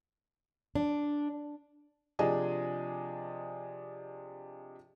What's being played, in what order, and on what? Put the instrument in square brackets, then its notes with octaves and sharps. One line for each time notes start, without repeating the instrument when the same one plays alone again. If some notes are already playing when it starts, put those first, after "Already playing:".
[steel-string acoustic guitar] D4
[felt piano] C3 F3 D4 G#4 D#5 G#5